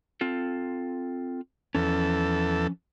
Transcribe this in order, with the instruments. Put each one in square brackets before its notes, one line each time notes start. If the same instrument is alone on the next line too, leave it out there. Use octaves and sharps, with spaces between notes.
[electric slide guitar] C4 F4 A4
[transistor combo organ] E2 A4 [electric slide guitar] F3 C#4